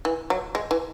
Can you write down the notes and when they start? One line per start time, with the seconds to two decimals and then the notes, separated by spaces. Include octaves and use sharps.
0.05 E3
0.30 F#3
0.55 G#3
0.71 E3